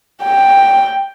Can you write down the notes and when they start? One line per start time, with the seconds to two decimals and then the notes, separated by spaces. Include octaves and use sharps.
0.23 G5